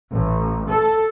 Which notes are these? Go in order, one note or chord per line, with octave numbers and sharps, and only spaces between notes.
A1
A4